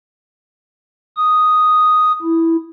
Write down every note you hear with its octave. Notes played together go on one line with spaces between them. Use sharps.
D#6
E4